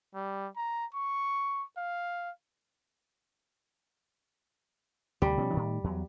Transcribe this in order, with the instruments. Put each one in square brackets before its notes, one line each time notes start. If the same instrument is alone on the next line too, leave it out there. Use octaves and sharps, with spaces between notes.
[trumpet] G3
A#5
C#6
F5
[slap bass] D2 C3 [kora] G3
[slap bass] B2 F3 C#4
A2 D#3
E2 F#3